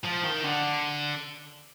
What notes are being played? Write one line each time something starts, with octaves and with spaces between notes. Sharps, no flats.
F3
D#3
D3